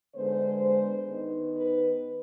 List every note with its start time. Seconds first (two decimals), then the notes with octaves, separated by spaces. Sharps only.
0.15 D3 G#3 B3 C5
1.08 D#3 B3
1.55 B4